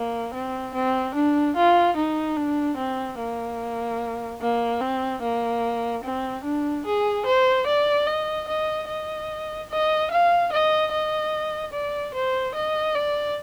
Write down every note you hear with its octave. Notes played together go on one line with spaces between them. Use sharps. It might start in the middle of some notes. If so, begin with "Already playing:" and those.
Already playing: A#3
C4
C4
D4
F4
D#4
D4
C4
A#3
A#3
C4
A#3
C4
D4
G#4
C5
D5
D#5
D#5
D#5
D#5
F5
D#5
D#5
D5
C5
D#5
D5